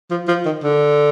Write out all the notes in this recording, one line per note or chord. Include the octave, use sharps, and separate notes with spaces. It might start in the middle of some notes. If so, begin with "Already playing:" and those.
F3
F3
D#3
D3